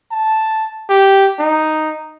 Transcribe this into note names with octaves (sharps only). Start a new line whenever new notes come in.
A5
G4
D#4